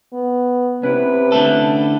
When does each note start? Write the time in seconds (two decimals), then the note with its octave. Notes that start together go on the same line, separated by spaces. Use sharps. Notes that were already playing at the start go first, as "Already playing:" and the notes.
0.13 B3
0.83 C3 C#4 E4 B4
1.32 D3 A3 A4